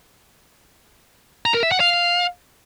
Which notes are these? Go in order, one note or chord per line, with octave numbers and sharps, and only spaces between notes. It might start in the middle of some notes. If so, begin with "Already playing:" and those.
A#5
A#4
E5
F#5
F5